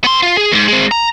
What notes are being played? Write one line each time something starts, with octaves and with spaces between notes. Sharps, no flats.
B3 C6
F4
G#4
D#2 G#2
G#3 C4
A#5